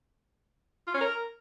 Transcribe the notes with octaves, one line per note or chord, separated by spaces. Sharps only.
F4
C#4
A#4